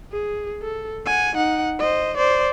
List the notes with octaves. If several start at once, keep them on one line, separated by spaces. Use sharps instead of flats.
G#4
A4
F#5 G#5
D#4 F#5
C5 D#5
C5 D5